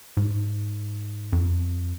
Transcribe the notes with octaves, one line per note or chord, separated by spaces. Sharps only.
G#2
F2